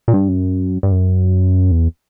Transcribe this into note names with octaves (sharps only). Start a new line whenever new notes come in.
A#2
G2
F#2
G2
F#2
E2